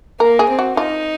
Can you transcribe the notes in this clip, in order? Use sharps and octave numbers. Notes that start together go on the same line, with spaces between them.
A#3 A#4
G#4
C4
F#4
D#4 F4